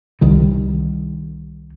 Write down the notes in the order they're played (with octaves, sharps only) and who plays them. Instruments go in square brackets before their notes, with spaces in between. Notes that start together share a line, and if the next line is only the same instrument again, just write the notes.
[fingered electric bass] C2 D#3 G3